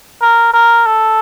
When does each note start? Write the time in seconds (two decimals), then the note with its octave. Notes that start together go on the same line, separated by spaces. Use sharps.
0.22 A#4
0.54 A#4
0.86 A4